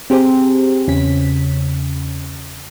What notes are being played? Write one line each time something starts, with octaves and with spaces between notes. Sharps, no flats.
C4 G4 G#4 C5
E2 C#3 C#4 B6